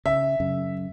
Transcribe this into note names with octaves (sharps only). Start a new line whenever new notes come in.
C#3 E5
F#2 C#3